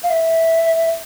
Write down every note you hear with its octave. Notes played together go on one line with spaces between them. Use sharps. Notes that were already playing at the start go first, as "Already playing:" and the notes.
F5
E5